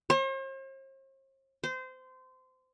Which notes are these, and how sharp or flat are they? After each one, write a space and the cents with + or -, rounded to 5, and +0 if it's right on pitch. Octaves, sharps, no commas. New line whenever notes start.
C5 +45
C5 -25